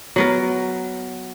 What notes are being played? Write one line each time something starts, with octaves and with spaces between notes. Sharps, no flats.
F#3 B3 A#4